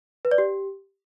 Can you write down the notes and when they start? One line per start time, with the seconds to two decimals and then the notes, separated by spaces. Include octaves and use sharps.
0.25 B4
0.31 D5
0.38 G4